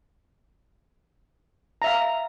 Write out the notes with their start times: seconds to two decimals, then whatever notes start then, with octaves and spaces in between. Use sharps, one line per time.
1.82 A#5
1.84 E5
1.87 F5